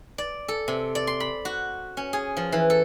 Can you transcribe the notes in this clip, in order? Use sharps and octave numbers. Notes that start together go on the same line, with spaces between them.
D5
A4
C3
D5
C6
B5
F#4
C#4
G#4
F3
E3
A4